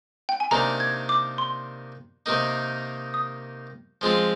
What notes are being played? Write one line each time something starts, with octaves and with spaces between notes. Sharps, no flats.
G5
G#5
C3 D#3 A#3 D4 A#5
G#6
D6
C6
C3 D#3 A#3 D#4
D#6
F3 G#3 C4 F4